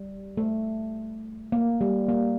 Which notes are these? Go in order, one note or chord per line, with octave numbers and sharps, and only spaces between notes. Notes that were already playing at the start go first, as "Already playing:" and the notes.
Already playing: G3
A3
A#3
G3
A#3